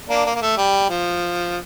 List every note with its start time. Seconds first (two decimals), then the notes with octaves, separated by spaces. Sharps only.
0.09 A#3 D4
0.25 A#3
0.35 A#3
0.42 A3
0.57 G3
0.90 F3